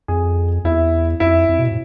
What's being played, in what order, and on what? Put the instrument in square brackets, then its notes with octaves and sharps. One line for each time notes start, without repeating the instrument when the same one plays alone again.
[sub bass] F2 [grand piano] G#4
[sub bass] E2 [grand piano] E4
[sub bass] F2 [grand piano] E4
[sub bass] F2
B2
A2